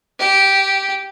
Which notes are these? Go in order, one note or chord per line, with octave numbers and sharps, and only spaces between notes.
G4